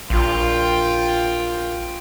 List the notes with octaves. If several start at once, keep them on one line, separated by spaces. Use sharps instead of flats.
A#1 F4 G5